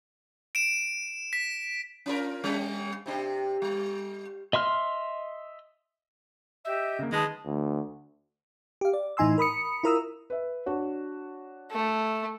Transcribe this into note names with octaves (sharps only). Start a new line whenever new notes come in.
D7 E7
B6
C#4 F4 A#4
G3 C#4
C3 D4 G4
G3
D#5 E5 C6 F6
G4 D#5 E5 G6
C#3 A#3
D#3 G#3 B4 A5 D#6
D2
G4 F5
D5
A2 E3 D#4 G#5 C6 E6
A#4 B5 D#6 C#7
E4 F4 A#4 A#5 D#6 E6
B4 E5
D4 F#4 C#5
A3